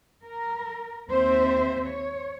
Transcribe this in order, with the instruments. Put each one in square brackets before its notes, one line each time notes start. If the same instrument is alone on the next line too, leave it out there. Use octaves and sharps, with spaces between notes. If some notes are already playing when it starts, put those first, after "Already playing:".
[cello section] A#4
D#2 C4 C5 E5
C#5